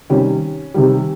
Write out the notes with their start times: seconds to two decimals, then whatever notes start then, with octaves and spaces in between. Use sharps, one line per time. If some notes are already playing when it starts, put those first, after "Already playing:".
0.10 C3 D#3 G3 C#4
0.74 C3 D#3 G3